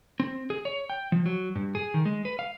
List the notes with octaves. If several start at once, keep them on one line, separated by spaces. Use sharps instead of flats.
C4
G#4
C#5
G5
F3
F#3
G2
G#4
D#3
G#3
B4
F5